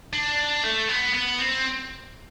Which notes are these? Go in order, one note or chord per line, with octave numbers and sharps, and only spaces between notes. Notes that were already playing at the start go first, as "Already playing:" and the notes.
D4
A3
B3
B3
C4